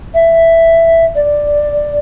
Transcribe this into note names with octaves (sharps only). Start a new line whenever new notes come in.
E5
D5